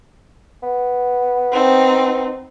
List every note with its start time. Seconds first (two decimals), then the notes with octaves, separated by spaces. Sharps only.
0.63 B3
1.52 C4 D#4